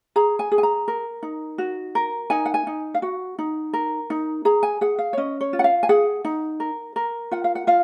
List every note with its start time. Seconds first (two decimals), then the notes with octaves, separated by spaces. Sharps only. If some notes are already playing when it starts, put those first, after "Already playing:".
0.16 G#4 A#5
0.39 G#5
0.52 G#4
0.58 G#5
0.63 A#5
0.88 A#4
1.23 D#4
1.58 F#4
1.95 A#4
2.30 D#4 G#5
2.45 F#5
2.54 G#5
2.67 D#4
2.94 F5
3.02 F#4 F#5
3.39 D#4
3.73 A#4
4.10 D#4
4.45 G#4 A#5
4.63 G#5
4.81 G#4 F#5
4.98 F5
5.13 C#5
5.17 C#4 D#5
5.41 C#5
5.53 F4
5.59 F#5
5.64 F5
5.83 G#5
5.89 G#4 F#5
6.25 D#4
6.60 A#4
6.96 A#4
7.31 F4 F#5
7.44 F5
7.55 F#5
7.67 F4 F5